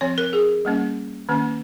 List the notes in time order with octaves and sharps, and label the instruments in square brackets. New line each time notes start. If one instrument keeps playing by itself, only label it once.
[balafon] F3 C4 C#5
A#4
G#4
G3 A#3 C#4
D#3 A#3 C#4